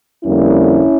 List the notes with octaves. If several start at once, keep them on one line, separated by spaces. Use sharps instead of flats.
F2 D3 G3 A#3 C#4 E4